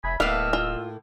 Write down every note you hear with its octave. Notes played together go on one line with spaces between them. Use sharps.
F1 E5 G#5 B5
D1 A2 A#3 B3 D#5 F5 E6 F6
F4